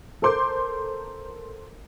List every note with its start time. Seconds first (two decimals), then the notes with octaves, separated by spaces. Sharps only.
0.22 A4 A#4 C5 C6 D6 G6